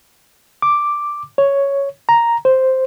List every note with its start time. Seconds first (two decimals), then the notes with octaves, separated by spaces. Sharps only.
0.62 D6
1.38 C#5
2.09 A#5
2.45 C5